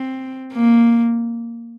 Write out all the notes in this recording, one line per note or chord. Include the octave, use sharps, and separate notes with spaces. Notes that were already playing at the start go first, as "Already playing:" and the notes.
Already playing: C4
A#3